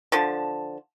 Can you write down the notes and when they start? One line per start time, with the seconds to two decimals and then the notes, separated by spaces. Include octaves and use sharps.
0.12 D3 F3 A5